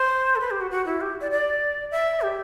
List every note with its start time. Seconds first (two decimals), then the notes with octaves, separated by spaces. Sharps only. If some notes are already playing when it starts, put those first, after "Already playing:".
Already playing: C5
0.36 A4
0.41 B4
0.51 G4
0.61 F#4
0.71 F#4
0.86 E4
1.01 G4
1.21 D5
1.31 D5
1.91 E5
2.22 G4